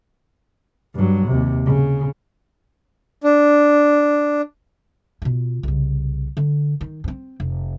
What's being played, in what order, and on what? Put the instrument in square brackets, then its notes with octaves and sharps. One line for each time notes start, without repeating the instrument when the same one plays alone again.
[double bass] G2 F#3
D#2 C3
C#3
[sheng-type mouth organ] D4
[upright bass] B2 F4
C2 C#3
D3
D#3
G2 C4
F1